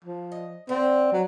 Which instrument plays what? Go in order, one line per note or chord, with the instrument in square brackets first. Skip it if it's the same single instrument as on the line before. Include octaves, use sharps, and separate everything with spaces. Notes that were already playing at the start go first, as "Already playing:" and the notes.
[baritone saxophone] F3
[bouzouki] D#5
[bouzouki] D3 [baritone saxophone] C4
[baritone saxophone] F#3